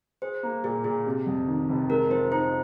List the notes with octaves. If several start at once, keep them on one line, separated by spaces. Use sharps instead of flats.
G#4 C5
A#3
A#2 G#4
A#2 G#4
C3
F2
D#3
F1
G#3 A#4
F3 C5
D#4 C5